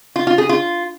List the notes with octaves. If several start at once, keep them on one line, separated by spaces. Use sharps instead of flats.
F4
F4
G#4
F4